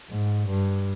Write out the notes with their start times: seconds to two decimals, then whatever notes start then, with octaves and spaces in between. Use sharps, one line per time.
0.10 G#2
0.47 G2